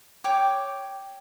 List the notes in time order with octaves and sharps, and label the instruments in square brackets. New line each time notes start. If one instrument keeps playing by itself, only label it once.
[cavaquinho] C#5 G5 D6